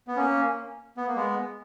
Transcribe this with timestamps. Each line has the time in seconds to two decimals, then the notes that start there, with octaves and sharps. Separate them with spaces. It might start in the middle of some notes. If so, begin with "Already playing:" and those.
0.08 B3
0.16 A#3 C#4
0.97 B3
1.07 A#3
1.16 G#3 B3